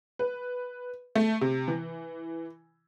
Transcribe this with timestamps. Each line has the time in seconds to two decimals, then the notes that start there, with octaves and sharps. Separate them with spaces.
0.19 B4
1.15 A3
1.41 C3
1.68 E3